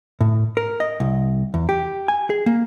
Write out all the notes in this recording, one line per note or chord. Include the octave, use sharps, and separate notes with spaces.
A2
A#4
D#5
C2
E2
G4
G#5
G#4
A#3